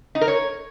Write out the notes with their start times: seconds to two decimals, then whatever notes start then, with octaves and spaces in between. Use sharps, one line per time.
0.15 D#4
0.21 A#4
0.28 C#5